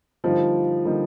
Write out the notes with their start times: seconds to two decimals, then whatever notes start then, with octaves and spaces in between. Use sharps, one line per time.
0.24 D3 F3 G3 A#3 D#4 G4
0.85 D3 G3 A#3 D#4 G4